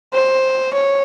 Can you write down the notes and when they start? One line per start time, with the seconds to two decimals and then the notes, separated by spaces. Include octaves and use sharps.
0.13 C5
0.73 C#5